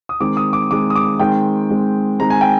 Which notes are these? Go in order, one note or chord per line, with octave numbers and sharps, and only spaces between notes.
D#6
D#3 G#3 C4 D6
D#6
D6
D#3 G#3 C4 D6
D#6
D6
D#3 G#3 C4 G5
D#3 G#3 C4
D#3 G#3 C4 A#5
G#5
G5